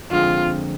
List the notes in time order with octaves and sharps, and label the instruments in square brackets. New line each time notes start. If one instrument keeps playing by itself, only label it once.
[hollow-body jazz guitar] F2 D3 G#3 C4 [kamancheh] F4